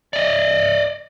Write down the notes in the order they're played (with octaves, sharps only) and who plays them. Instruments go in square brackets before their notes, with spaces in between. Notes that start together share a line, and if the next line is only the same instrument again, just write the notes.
[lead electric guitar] D5 D#5